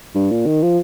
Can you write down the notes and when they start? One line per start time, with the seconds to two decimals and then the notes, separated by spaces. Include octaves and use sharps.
0.15 G2
0.31 A#2
0.46 D#3
0.63 F3